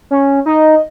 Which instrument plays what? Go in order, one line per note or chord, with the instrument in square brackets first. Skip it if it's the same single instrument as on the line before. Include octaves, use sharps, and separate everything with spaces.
[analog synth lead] C#4
[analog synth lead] D#4 [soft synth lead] D#5